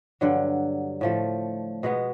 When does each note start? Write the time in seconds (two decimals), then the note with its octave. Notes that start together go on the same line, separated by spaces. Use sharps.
0.21 G2 D3 F#3
1.01 A2 F3 A3
1.83 B2 G#3 B3